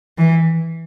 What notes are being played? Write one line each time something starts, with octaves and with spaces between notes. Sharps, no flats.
E3